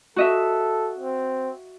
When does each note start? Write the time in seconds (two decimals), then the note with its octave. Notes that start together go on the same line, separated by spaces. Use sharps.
0.16 F#4 A4 D#5 E5
0.98 C4